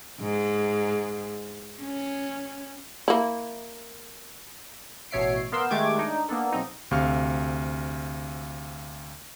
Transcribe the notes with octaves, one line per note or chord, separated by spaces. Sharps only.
G#2
C#4
A#3 E4
A1 B2 C#5 E5 C7 D7
B3 A#4 F5 C6 E6 G6
D#3 G#3 A3 G4 D6 G#6
D4 D#4
A#3 B3 D4 A4
B1 C4 D#4
D2 C3 F5 C#6 F6